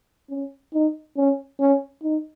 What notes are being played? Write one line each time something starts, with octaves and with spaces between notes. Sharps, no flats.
C#4
D#4
C#4
C#4
D#4